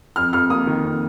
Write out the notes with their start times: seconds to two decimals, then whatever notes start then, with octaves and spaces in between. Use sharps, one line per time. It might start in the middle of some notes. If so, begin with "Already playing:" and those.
0.16 F2 F6
0.33 F2 F6
0.50 A#3 D#6
0.67 D#3
0.83 F2